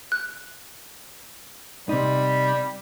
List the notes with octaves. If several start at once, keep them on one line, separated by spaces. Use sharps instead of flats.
F#6
C3 G3 D#4